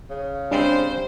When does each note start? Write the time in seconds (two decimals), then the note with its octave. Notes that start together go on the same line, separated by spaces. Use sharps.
0.10 C#3
0.51 G3 G#3 C4 D4 C5